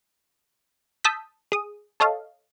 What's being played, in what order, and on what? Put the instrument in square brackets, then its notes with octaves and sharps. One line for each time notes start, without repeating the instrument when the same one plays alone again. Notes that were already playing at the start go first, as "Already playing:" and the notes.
[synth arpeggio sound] A5 D#6 E6 G6 B6
G#4 D#6
A4 C#5 D#5 F5 A5